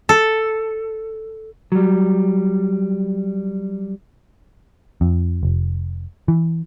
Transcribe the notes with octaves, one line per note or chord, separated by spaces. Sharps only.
A4
F#3 G3
F2
F1
E3